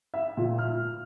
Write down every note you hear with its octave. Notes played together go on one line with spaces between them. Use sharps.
E5
A#2
F6